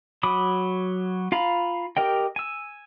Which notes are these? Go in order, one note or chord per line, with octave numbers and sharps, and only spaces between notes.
F#3 B5 D6 D#6
F4 F5 A#5 B5
G4 A#4 D#5 G5
G#5 E6